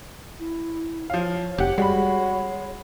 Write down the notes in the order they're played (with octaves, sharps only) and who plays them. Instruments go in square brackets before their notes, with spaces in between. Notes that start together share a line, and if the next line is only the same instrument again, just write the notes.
[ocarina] E4
[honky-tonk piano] F3 F5 [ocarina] C#5
[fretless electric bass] F1 [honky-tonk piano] G4 F#5
[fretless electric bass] G3 [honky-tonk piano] G#3 B5 [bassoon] F#4